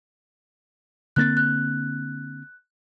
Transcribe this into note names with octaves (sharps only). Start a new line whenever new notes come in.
D3 A#3 C4 F#6 A6
F#6